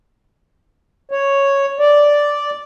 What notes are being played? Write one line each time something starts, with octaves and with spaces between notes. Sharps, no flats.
C#5
D5